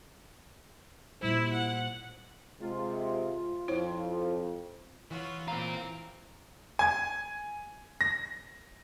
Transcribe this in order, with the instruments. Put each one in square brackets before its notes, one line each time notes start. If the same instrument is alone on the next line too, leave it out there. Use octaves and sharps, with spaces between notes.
[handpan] A#2 G3 C5 [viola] E4
[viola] F#5
[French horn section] C3 G#3 [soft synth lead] F4
[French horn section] F2 [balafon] E4 C5 C#5
[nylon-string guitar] E3 [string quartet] F4 F#4 C#5
[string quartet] C4 [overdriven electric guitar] F4 A#4 [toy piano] A#5
[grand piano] G#5 G#6
A#6